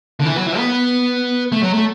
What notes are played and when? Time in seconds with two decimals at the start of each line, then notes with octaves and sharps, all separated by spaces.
0.20 D3
0.25 E3
0.36 F#3
0.46 E3
0.57 B3
1.52 A3
1.63 F#3
1.73 A3